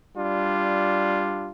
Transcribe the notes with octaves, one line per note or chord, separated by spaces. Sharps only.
G3 D4 F4